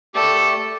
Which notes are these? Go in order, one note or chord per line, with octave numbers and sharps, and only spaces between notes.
A3 G4 A4 D5